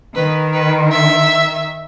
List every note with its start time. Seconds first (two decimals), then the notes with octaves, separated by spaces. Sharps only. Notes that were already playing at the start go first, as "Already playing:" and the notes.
0.16 D#3 B4
0.54 B4
0.92 E5